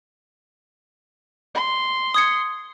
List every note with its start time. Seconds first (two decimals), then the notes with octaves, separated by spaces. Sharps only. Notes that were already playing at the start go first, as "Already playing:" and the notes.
1.55 C6
2.14 D#6 G#6 C#7